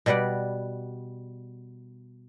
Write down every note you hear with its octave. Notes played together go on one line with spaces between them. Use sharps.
B2 G3 B4 D5 F#5